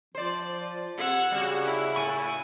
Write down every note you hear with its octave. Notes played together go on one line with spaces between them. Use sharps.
F3 C5 D5
C3 F#5 E6 G#6
C#3 G3 F#4
E4
A2 G#5 C#6